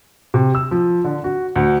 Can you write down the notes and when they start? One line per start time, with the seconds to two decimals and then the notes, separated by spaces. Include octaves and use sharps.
0.34 C3
0.55 E6
0.71 F3
1.04 D3
1.24 F#4
1.56 D2